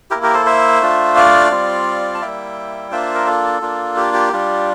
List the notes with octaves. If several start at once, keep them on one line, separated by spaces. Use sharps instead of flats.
A#3 E4 G4 A#4
G4 A#4
A4 C5
C5 E5
A3 D4 F4
D5 F5
G3 C4 F4
A5
G3 A#3 E4 E5 G5
A#3 D4 F4 C5 E5
A#4
A4
A#3 D4 F4
G4
G4
G3 D4 F4